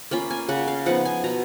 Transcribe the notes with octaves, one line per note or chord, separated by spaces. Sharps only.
A#3 C#4 F4 B5
G#5
C#3 F#5
F5
F3 B3 D#4 F#5
G#5
B2 A#5